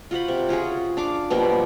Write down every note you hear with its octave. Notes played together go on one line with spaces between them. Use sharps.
F4 F#4 C5 B5
C3
C#4 F4 F#4 G#4
D4 F5 D6
B2 F3 G3 A#3